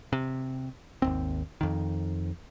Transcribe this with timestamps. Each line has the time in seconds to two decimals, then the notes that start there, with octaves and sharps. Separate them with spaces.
0.13 C3
1.02 G#1 D#2 C4
1.61 F2 D#3